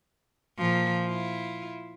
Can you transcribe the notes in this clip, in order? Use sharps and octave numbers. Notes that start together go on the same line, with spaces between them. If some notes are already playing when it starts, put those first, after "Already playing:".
A#2 F3
E4 F4